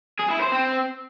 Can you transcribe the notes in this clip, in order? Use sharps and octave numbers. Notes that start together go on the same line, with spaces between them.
G#4
E4
C5
C4